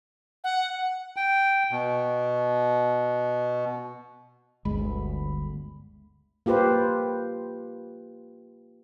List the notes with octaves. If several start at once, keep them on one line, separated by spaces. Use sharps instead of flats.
F#5
G5
B2
G1 D2 G#3 B5
A#3 F4 G4 B4 C5